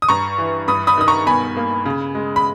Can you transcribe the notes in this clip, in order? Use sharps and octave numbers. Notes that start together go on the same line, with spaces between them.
D#6
G2 A#5 C#6
E3
G2 B5 D#6
B5 D#6
D#3 D#6
A#5 C#6
B2 G#5 B5
A#3
C#3
G#3
B5